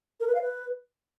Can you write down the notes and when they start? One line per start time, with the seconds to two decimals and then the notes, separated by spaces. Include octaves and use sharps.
0.20 A#4
0.27 B4
0.35 F5
0.42 B4